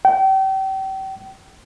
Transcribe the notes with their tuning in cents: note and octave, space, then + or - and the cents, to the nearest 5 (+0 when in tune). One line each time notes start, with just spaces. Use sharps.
G5 -35